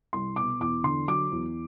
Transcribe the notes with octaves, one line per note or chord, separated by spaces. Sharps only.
C2 C6
B2 D6
E2 D6
D3 C6
F#3 D6
E2